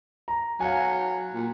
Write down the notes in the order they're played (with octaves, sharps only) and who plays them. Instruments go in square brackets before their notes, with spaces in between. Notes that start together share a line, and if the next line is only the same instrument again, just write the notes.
[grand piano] A#5
[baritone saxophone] F#3 [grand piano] F5 G#5
[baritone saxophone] A#2